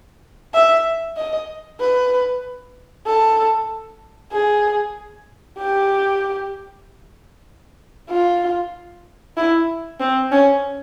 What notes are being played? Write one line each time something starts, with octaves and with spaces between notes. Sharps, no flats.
E5
D#5
B4
A4
G#4
G4
F4
E4
C4
C#4